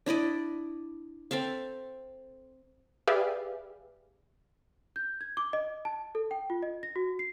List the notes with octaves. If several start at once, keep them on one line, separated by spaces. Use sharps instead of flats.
D4 E4 D5 D#5
C4 A4 E5 F5
G4 G#4 B4 D5 E5 F5
G6
G#6
D6
D#5
A5
A4
G5
F4
D#5
A#6
F#4
C7